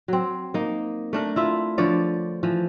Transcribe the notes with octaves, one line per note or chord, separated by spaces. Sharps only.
F#3 C4
A#3 D#4
A3 D4 A#4
E4 F4 E5
D3 F3 C#5 D5
E3 F3